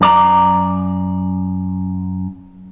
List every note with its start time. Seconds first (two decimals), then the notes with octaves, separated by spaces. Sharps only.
0.01 F#2 D5 A#5